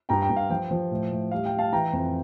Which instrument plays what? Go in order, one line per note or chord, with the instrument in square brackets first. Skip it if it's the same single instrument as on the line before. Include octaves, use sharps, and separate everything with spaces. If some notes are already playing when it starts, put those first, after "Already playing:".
[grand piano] G2 G5 A#5
G5
G2
F5
F3 G5
F3
A2
A2
G3 F5
G5
G3
F5 A5
E3 G5 A#5
F2